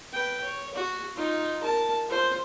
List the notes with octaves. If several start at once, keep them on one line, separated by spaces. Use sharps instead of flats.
B4 G5
C#5
F#4
D#4 F4
A#4 A5
F4 C5